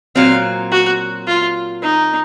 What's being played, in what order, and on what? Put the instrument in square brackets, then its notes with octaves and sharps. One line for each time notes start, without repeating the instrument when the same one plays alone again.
[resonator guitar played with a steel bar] A#2 F#3 C4 [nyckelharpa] F5
[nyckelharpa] F#4
F4
D#4